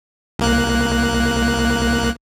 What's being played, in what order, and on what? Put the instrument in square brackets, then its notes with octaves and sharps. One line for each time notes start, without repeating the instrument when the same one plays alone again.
[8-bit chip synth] C2 A#3 F#6